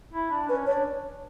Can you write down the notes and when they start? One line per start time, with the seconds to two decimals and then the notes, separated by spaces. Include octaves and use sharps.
0.13 E4
0.31 D4
0.48 C#4 B4
0.66 D4 C#5